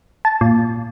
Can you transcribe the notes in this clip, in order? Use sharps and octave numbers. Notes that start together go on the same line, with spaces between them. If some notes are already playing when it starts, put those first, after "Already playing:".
A5
A#2